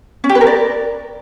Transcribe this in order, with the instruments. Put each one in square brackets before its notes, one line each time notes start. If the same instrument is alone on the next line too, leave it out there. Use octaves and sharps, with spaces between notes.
[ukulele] C#4
G4
B4
A#4
D5